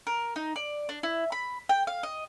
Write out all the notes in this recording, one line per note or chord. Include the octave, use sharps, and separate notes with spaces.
A#4
D#4
D5
D4
E4
B5
G5
F5
D#5